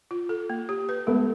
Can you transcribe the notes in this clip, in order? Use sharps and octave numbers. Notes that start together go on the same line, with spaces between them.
F4
A4
A#3
G4
B4
G#3 A3 B3